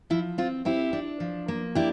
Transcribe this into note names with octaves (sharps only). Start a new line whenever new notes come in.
F3 E4
C4 F4
C4 E4 G4
D4
F3
A#3
D4 E4 G4